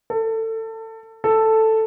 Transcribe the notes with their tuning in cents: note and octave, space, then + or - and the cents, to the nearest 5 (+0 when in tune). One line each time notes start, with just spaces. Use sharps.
A4 +25
A4 +5